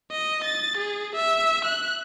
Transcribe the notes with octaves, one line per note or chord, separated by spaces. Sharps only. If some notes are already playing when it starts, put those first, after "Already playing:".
D#5
A6
G#4
E5
F#6